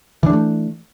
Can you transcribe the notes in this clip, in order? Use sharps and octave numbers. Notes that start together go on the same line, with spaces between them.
E3 G3 A3 D4